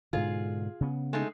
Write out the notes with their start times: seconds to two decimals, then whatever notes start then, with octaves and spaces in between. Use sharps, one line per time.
0.13 G#2 B2 D3 F4 G#4
0.81 C#3 B3
1.13 G#3 A3 D#4